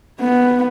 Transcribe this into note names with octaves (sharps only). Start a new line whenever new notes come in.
B3